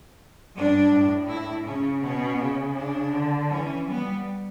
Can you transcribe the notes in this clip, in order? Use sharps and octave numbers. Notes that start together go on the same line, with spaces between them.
G2 D4
A2
E4
C#3 C#4
B2 C#4
C#3
D4
D3
E3 C#4
G3 B3